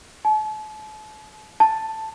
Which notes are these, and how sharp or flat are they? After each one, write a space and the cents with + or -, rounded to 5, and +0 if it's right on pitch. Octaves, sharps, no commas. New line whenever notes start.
A5 -40
A5 +5